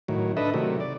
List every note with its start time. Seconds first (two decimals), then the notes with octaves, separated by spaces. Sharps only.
0.08 A2 D#3 F#3
0.37 D4 A4 B4 D#5 E5
0.54 C3 D#3 F#3 A3
0.80 D5